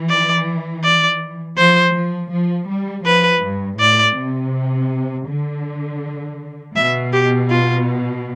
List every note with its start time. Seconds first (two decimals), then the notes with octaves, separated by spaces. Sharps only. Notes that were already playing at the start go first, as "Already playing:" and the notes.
Already playing: E3
0.09 D5
0.84 D5
1.57 F3 C5
1.95 F3
2.32 F3
2.69 G3
3.06 F3 B4
3.43 G2
3.79 A2 D5
4.17 C3
5.28 D3
6.76 B2 E5
7.13 G4
7.50 F4